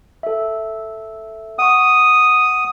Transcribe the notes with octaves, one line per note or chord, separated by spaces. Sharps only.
A4 E5
F#5 C#6 D#6